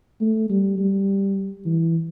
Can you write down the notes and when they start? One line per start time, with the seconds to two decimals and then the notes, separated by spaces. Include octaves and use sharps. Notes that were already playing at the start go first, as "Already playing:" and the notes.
0.21 A3
0.50 G3
0.78 G3
1.66 E3